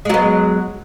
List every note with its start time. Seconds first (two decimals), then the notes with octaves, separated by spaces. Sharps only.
0.05 G#3
0.10 F#3
0.14 B3